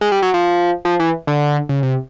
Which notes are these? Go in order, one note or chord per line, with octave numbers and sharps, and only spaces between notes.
G#3
G3
F#3
F3
F3
E3
D3
C#3
C3